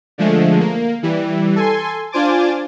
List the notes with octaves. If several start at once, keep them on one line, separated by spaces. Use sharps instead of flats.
D3 F3 G#3 A3
A#3
E3 G3
A4 G#5 C6
D4 F4 C5 G#5 D6 A6